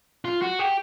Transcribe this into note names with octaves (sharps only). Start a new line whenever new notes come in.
F4
F#4
G4